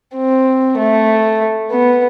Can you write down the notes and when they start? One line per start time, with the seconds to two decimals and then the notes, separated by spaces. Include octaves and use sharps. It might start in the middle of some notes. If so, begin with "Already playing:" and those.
0.16 C4
0.78 A3
1.71 B3